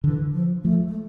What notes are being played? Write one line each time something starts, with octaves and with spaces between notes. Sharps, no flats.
D3 E3
F3
F3 A3
A3